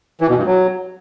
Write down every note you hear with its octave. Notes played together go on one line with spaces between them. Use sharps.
E3
B2
G2
F#3